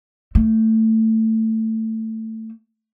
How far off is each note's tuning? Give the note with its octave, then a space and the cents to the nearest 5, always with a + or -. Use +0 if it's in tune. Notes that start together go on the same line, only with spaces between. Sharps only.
A3 +15